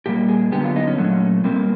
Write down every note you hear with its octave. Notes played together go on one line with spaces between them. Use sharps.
A#2 G3 A#3 G4
G#4
F#2 D3 F#3 B3 G4
F4
D#4
C#4
A#2 F#3 A3
B2 G3 A#3 C4